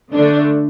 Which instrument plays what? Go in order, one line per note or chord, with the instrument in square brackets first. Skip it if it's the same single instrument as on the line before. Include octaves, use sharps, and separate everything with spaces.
[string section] D3 A3 D4